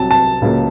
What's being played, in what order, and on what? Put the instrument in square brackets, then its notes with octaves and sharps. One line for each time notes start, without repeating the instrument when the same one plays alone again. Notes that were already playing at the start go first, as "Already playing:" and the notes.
Already playing: [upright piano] C2 C3 F#3 [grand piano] A5
[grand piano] A5
[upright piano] C#2 C#3 F#3 A#3